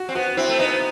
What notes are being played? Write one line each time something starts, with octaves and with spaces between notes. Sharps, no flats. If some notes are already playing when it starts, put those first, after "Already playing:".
Already playing: F#4
C4
B3 F#4
C4 E4
A3
B3 D#4